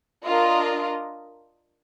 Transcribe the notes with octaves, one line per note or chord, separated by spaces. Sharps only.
D4 F4 A#4 D#5